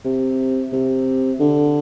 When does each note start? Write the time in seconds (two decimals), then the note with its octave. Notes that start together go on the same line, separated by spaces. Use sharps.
0.05 C3
0.72 C3
1.40 D3